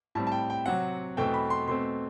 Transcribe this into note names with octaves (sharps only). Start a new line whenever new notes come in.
A2 G3 C4 A5
A5
G5
G5
C3 F#3 C4 F#5
E2 B2 A3 C4 G5
B5
C6
B2 A3 C4 C6